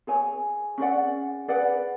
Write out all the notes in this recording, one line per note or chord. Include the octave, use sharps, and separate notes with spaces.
G#4 C#5 G#5
C#4 G#4 D5 F#5
G#4 B4 D5 F#5